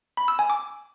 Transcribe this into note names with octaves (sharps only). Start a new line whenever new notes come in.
B5
E6
G#5
D6